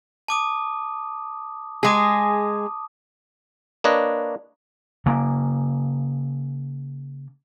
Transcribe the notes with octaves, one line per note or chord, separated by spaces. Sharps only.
A5 D6 D#6
G#3 G#4 A5 D6 D#6
A#3 D4 B4 C#5 D#5
C#3 A#3